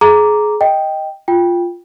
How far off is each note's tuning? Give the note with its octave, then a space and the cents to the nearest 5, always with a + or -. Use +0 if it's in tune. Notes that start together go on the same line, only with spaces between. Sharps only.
G#4 +25 A#5 +0 D6 -5
D#5 +5 G5 +0
F4 +0 G5 +10